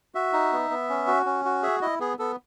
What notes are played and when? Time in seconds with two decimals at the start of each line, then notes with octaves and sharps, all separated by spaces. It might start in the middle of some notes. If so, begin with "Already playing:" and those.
0.15 F#4 E5
0.33 D#4
0.52 B3
0.70 B3
0.89 C#4
1.07 F#4
1.26 C#4
1.45 F#4
1.62 G#4 E5
1.82 E4 D#5
2.00 B3 G#4
2.19 B3 A4